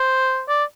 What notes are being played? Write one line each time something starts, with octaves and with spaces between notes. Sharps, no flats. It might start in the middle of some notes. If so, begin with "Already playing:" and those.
Already playing: C5
D5